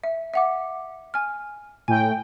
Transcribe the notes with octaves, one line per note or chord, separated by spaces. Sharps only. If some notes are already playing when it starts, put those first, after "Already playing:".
E5
E5 F#5 D6
G#5 F6
A2 G5 G#5